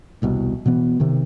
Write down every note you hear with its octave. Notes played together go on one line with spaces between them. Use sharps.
E1 C2 B2
B2 E3 B3
C3 D#3